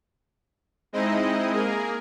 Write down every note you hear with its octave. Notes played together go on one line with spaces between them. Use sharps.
G#3 C4 D#4 E4 D#5
A#3 G#4 A#4